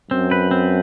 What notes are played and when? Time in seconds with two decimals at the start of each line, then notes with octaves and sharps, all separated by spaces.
0.11 F#2 C4
0.31 B4
0.51 C4